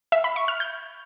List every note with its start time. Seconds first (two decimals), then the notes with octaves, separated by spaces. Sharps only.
0.12 E5
0.24 B5
0.36 C#6
0.48 F6
0.60 G6